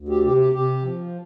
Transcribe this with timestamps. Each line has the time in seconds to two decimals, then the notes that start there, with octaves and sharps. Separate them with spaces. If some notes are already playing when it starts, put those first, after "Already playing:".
Already playing: D2
0.09 G4
0.23 C3 G4
0.37 G4
0.52 C3 G4
0.82 F3